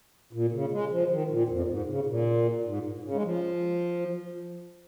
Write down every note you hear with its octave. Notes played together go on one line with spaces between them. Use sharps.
A#2
C#3
G#3
F3
D#3
A#2
F2
A#2
G#2
C#3
A#2
G#2
C#3
G#3
F3